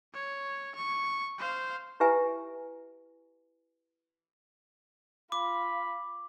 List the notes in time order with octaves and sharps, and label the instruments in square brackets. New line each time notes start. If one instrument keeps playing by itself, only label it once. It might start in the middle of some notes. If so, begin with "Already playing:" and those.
[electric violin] C#5
C#6
C5 F5
[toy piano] E4 G4 B4 E5 G#5
[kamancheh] F4 [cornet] B5 [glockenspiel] D6